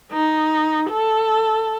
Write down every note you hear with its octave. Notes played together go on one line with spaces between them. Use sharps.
D#4
A4